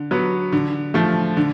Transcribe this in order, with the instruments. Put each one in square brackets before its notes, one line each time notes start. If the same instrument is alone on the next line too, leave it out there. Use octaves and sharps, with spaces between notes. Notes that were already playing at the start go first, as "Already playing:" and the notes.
Already playing: [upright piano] D3
F#3 B3
D3
F3 A3
D3